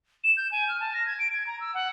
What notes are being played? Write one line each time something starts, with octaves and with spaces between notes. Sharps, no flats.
E7
G6
G#5
F6
A5
A#6
G#6
D7
G#6
A#5
E6
F#5